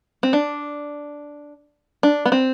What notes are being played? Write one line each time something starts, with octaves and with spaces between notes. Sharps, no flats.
C4
D4
D4
B3
C4